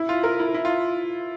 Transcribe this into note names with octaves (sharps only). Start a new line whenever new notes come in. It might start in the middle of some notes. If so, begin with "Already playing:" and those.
Already playing: E4
F4
A#4
E4
E4
F4